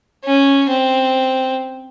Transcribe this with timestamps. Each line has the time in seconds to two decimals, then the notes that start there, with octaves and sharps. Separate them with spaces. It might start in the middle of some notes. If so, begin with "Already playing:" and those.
0.25 C#4
0.70 C4